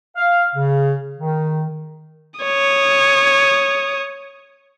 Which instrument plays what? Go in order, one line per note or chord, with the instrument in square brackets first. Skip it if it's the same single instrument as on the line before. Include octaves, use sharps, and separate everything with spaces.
[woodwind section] F5
C#3
D#3
[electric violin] C#5 D#6